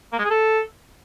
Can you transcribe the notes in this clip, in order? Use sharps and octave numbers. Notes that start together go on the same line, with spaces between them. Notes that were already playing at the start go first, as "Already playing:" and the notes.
A#3
G#3
G#4
A4